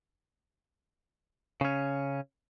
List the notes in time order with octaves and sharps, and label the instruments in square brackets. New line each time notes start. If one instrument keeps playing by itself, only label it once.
[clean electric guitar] C#3 C#4